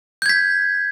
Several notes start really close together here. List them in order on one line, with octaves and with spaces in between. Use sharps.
G6 G#6 B6